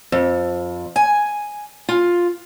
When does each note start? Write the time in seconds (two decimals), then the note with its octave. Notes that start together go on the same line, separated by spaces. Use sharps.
0.12 F2
0.96 G#5
1.89 F4